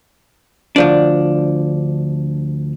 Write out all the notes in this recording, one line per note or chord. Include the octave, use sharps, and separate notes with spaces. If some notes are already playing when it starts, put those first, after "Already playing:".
D2 F3 D4